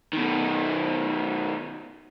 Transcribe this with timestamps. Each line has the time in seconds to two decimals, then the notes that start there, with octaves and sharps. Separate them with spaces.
0.13 B2 D#3